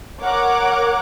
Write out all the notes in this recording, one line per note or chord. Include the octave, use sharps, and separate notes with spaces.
A#4 C#5 F#5 D6